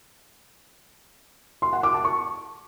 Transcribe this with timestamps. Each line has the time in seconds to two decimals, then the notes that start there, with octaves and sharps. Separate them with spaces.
1.62 C6
1.73 F#5
1.83 D6
1.94 A5
2.05 C#6